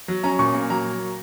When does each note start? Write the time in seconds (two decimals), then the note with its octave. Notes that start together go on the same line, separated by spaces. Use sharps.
0.08 F#3
0.23 C#4 A#5
0.39 A#2 C#6
0.54 A#3
0.70 F#3 A#5